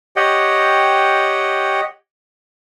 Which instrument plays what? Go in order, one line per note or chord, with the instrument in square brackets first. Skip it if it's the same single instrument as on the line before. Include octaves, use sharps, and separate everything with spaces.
[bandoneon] G4 C#5 D#5 F#5 G5